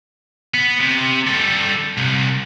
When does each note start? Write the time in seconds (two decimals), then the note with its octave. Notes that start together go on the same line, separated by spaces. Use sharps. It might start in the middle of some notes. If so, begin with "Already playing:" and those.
0.54 B3
0.80 C3
1.27 G3 A4
1.98 C2